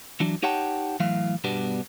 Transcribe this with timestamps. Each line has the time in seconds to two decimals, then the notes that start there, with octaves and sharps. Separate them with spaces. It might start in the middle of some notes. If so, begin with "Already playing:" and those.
0.20 E3 F#3 D4
0.43 D#4 G4 C#5 F#5 G5 A5
1.00 A2 E3 F#3 A3 F5
1.44 G2 B2 G3 B3 D4